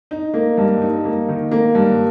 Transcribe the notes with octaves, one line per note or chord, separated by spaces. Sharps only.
D#4
A#3
G2
D#4
A#3
D#3
A#3
G2